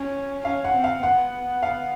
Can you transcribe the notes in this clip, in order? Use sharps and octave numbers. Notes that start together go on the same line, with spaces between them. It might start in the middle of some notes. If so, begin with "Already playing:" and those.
Already playing: C#4
C#4 F5
F#5
C4
F5
B3 F#5
F5